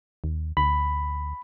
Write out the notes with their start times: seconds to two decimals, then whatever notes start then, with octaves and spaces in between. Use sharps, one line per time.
0.24 D#2
0.57 D2 B5